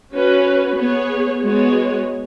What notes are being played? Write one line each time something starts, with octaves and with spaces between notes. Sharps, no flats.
C#4 F#4 B4
B3 G#4 C#5
G#3 B3 F#4 C#5